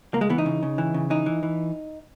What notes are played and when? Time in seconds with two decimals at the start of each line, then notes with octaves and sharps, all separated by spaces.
0.13 C#2 A#3
0.21 G#3
0.30 E3 B3
0.38 D#4
0.46 C#3
0.63 C#3
0.78 E3
0.94 C#3
1.10 E3 D#4
1.26 E3
1.43 E3